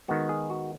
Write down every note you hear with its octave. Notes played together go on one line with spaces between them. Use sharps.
D#3 G#3 B3 F#4
G#4
F#4